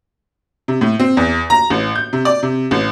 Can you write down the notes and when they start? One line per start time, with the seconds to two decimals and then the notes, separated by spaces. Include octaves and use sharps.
0.68 C3
0.81 A2
1.00 C4
1.17 E2
1.50 A#5
1.70 A1
1.95 G6
2.13 C3
2.25 D5
2.43 C3
2.71 A1